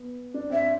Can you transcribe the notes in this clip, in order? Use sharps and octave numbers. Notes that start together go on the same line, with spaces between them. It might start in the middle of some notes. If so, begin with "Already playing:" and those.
Already playing: B3
D4
C4 E5